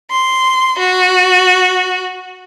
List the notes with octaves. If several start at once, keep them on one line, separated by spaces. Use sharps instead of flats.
C6
F#4